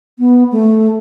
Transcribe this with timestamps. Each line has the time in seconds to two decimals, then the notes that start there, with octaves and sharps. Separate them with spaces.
0.19 B3
0.52 A3